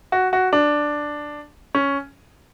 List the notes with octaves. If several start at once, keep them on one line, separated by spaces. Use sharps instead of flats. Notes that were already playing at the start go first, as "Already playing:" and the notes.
F#4
F#4
D4
C#4